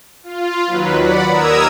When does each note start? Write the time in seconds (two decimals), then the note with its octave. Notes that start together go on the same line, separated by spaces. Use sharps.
0.23 F4
0.67 D#2 F#3 B4
0.99 D5 F#5 B5
1.30 D#2 A#4 A#5 D#6 E6 G#6